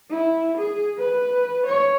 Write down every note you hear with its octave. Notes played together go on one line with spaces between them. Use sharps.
E4
G#4
B4
C#5